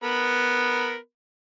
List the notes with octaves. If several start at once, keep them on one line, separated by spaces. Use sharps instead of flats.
B3 A#4 B5